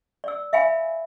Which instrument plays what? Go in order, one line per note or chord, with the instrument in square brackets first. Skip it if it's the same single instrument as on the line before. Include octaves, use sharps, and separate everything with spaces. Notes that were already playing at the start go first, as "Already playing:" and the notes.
[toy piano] D5 E6
E5 F5 G#5 B5